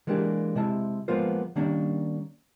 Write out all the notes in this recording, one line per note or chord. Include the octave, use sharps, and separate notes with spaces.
E3 G#3 A#3 D4 G4
C3 G#3 E4 A5
F3 G#3 A#3 B3 F4 C5
D#3 G3 A#3 C#4 D4